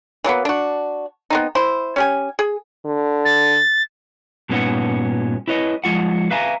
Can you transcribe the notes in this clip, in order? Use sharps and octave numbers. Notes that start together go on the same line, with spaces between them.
E3 F#3 A#3 B3
D4 F#4
B3 C4 D#4
E4 C5
C#4 G4 G#5
G#4
D3
A6
G2 A#2 B3 C#4 D#4 F#5
E4 B4 C#5 D#5
F3 G#3 F4 F#5
B4 E5 F5 G#5 A#5